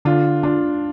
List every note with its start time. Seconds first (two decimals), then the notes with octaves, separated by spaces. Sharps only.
0.05 D3 D4 F4
0.43 D4 F4